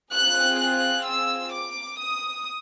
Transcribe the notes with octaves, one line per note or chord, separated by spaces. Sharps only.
C4 F4 G#4 F#6
F#6
E6
D6
D#6